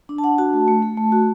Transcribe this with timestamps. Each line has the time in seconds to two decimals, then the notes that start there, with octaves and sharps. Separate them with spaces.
0.09 D4
0.18 A5
0.23 D4 F#5
0.38 F#4 A5
0.53 A3
0.68 A3
0.82 A3
0.97 A3
1.12 F#4